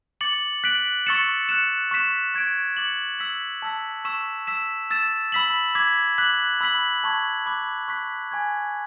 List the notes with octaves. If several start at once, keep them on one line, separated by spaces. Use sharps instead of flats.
D6 A6 C#7 F#7
F#6 B6 D7 F#7
C#6 E6 A6 C#7 E7
F#6 C#7 E7
C#6 F#6 B6 E7
C#6 G#6 D7
D6 A6 C#7 F#7
E6 B6 F#7
A5 E6 B6
C#6 E6 B6 E7
E6 B6 E7
E6 A6 E7
B5 E6 B6 F#7
D6 G#6 B6
D6 F#6 B6 F#7
B5 E6 B6 F#7
A5 C#6 G#6
B5 D6 F#6
C#6 F#6 B6
G#5 C#6 G#6